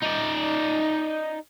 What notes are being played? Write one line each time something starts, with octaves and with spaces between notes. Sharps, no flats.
D#4 D5